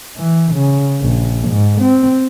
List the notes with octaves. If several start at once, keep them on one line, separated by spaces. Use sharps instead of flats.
E3
C#3
A#1
G#2
C4